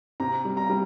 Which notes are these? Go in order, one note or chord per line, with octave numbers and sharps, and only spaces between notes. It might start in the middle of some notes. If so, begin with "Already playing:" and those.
C3 A#5
G3
A#5
G3